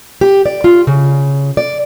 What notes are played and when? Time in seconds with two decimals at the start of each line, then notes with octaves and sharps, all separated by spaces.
0.21 G4
0.46 D5
0.64 F4
0.87 C#3
1.57 D5